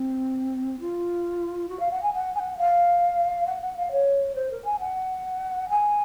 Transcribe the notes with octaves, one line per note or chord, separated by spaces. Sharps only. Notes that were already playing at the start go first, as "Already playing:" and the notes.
Already playing: C4
F4
F#4
F5
F#5
G#5
F#5
G#5
F#5
F5
F#5
F#5
F5
C#5
C5
A#4
G#5
F#5
G#5